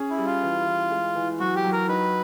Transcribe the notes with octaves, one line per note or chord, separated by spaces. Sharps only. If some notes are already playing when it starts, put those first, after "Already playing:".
Already playing: C#4 G#4
E4
G3
F4
E3
E3
G#3
E3
F#3 F#4
G4
F#3
A#4
D#4 B4